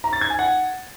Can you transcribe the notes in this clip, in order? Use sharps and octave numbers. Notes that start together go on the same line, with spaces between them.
A#5
A6
G#6
G#5
F#5